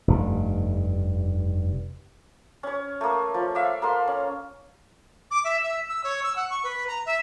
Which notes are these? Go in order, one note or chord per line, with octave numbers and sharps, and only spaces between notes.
F1 G2
C#4 C#5
A3 A#3
F3
E5 F5 D6
A#3 A4 F5 C6
C#4
D6
E5
E5
E6
C#5
E6
F#5
C#6
B4
A#5
E5